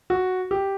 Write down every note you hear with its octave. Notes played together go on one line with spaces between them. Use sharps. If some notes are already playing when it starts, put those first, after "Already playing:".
F#4
G4